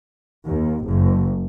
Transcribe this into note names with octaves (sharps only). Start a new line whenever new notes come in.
D#2
F#1